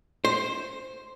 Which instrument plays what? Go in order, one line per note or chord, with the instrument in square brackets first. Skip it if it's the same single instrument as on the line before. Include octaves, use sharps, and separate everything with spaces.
[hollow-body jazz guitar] C5